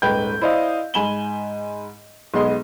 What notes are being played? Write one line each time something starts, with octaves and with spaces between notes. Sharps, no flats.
D#1 G#2 B4 G5 G6
E4 C5 D5 D#5 F5
G#2 G#5 B5 E7 F#7 G7
B1 G#3 B3 D#5 C6